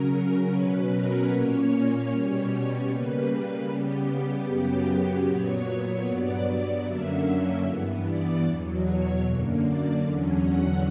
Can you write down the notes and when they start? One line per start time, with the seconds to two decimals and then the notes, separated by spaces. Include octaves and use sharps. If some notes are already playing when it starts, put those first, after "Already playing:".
Already playing: C#3 F#3 C#4 A#4
0.51 B2 F#3 C#4 B4
0.90 A#4
1.30 A#2 A#3 C#4 C#5
2.09 B2 G3 C#4 C#5
2.89 C#3 G3 A#3 B4
3.67 C#3 G3 B3 G4
4.48 F#2 C#3 F#3 B3 G4
5.26 A#2 F#3 B3 C#5
6.06 G2 F#3 B3 D5
6.84 F#2 D3 F#3 A#3 C#4 E5
7.24 E5
7.64 G2 E3 B3
8.03 D5
8.43 E2 B2 F#3
8.83 C#5
9.22 F#2 D3 A#3
9.62 D5
10.02 E2 D3 F#3 C#4
10.41 F#5